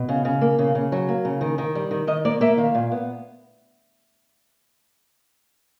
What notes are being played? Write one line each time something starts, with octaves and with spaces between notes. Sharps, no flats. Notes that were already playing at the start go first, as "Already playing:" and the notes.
Already playing: B2
C#3
C#3
A#3
C#3
C#3
F#3
A#3
C#3
D#3
D#3
G3
D#3
D#3 D#5
A#3 D5
A#3 E5
D#3 F5
A#2
B3